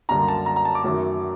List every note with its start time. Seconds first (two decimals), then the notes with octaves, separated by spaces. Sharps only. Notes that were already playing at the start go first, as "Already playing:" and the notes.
0.09 F#2 D3 G3 A#3 D4 A#5
0.28 A5
0.46 A#5
0.56 A#5
0.65 A5
0.75 D6
0.83 F#2 D#3 F#3 A3